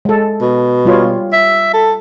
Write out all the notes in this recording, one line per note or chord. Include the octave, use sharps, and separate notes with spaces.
G#3 A4
B2
G3 F4 C#5
E5
A4